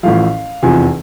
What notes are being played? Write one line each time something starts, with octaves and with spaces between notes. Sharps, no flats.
A1 A2 F3 F5
F1 E2 C3 F3 G#5